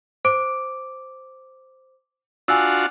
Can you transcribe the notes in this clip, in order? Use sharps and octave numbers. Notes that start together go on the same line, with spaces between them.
C5 D6 D7
D4 F4 F#4 G#5 E6